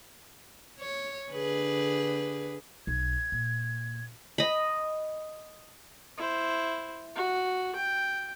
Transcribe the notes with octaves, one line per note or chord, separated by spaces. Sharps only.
C#5
D3 G#4 B4
B1 G#6
A#2
D#5 B5
E4 C5
F#4
G5